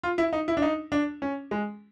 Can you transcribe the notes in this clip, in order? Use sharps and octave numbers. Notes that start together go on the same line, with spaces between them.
F4
E4
D#4
E4
D4
D#4
D4
C#4
G#3